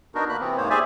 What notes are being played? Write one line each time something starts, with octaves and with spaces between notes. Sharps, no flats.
B3 D4 D#4 F#4 A#4
D2 A#3 B5 F#6
C3 E3 B3 C4
G#2 C3 A#3 B3 C5 C#5
G4 G#4 C5 D5 E5 G#5